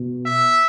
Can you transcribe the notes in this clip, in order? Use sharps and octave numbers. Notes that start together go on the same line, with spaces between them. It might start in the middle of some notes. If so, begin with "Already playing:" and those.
Already playing: B2
E5